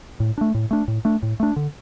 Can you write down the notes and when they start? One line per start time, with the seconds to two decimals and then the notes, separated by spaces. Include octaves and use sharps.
0.20 A2
0.38 A3 D4
0.54 A2
0.71 A3 D4
0.88 A2
1.05 A3 D4
1.23 A2
1.40 A3 D4
1.56 D3